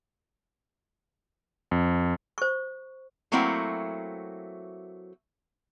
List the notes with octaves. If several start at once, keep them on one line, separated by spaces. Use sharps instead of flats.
F2
C5 C#6
F#3 A3 A#3 C4 E4 F#4